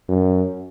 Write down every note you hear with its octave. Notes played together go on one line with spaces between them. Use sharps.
F#2